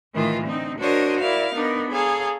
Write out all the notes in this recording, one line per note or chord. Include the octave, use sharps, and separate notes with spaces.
A2 D#3 E3 A3 F4
D3 C4 D#4
D4 F#4 A#4 C5 C#5 D#5
E4 A#4 D5 F5
B3 D4 D#4 A#4
G#4 A4 C#5 F5 A#5